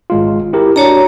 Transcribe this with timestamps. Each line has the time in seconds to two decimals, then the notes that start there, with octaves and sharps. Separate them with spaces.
0.10 G#1 G#3 F4
0.53 E4 G4 A#4
0.76 D4 F#4 C#5 D5 A#5